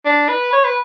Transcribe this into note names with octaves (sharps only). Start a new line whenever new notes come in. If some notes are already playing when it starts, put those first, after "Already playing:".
D4
B4
C#5
B4